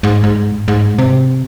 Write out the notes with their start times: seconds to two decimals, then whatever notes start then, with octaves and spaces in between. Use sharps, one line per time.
0.03 G#2
0.24 G#2
0.68 G#2
0.98 C3